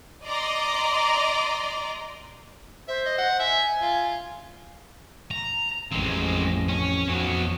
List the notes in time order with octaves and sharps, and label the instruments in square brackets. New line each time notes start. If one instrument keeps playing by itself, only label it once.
[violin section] D5 D#5 A#5 C6 D6
[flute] C5 [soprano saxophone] E5
[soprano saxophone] D#5
F#5
[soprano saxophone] E5 [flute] G#5
[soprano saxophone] F4
[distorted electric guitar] A#5
[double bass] A1 F2 [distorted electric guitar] G#3 C4
[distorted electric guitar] C#4
[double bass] F2 [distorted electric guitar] F#3 B3